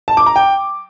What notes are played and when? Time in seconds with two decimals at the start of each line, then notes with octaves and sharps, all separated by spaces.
0.08 A5
0.17 D6
0.26 A#5
0.36 G5